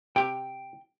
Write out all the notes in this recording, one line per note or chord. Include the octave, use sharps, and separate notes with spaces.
C3 G4 G5